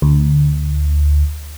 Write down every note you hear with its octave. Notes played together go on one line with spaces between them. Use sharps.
D2